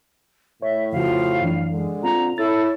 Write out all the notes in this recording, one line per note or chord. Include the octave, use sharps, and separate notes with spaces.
A2 C#5 E5
F2 C#3 F3 F#4 F5
F#2 E3 D4
D3 G#3
C4 F4 A#5
E4 A4 C#5 A6